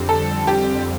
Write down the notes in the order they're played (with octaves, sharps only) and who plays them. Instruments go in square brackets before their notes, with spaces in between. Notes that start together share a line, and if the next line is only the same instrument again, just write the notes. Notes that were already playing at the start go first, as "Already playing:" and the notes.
Already playing: [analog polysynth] F2 D3 G3 C4
[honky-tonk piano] A4
G4